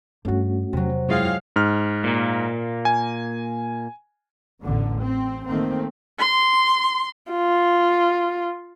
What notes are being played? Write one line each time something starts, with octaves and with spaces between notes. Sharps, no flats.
G2 G3 A3 C#4 F#4
E2 C3 F#3
F#2 G#3 E4 F4 C#5 F5 G5
G#2 F6
A#2 A#3
G#5
A1 E2 D3
C4
D#3 A3 A#3 C4
C6
F4